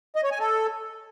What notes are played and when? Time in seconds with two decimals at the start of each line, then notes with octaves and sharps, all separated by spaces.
0.16 D#5
0.24 C#5
0.32 G#5
0.39 A4